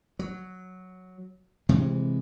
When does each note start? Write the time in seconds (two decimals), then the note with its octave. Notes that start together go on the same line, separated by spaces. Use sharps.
0.19 F#3
1.69 C3 E3 G#3